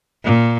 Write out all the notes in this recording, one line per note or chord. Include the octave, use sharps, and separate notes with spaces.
A#2